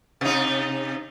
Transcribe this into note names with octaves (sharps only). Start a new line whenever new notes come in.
C3 D#4